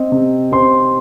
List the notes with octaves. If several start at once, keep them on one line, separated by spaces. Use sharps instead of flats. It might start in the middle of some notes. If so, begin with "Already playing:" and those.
Already playing: C4 D#5
C3
C3 C5 C6